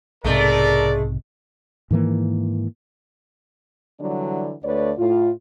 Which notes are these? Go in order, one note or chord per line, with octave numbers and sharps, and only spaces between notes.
B1 G#2 C3 G#3 A3 A4 A#4 D5
G#2 D#3 E3 A#3
D3 E3 F#3 G3 D4
D2 A3 B4 C#5 D5
A2 F4